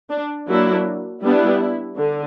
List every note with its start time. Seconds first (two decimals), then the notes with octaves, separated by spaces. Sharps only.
0.10 D4
0.47 F#3 A#3 D4 E4
1.22 G3 B3 D4 E4
1.97 D3